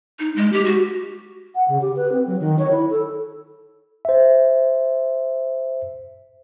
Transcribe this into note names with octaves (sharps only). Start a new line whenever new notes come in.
D#4
G#3
G4
F#4
F#5
C#3
G4
B4
C4
F#3
D#3
C#5
E4
A4
C5 E5